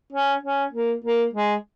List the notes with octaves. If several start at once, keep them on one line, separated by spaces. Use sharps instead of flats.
C#4
C#4
A#3
A#3
G#3